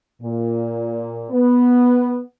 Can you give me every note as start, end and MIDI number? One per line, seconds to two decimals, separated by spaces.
0.20 1.24 46
1.31 2.20 59